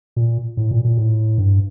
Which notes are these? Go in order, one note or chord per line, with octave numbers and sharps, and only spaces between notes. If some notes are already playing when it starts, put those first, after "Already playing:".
A#2
A2
A#2
A#2
A2
G2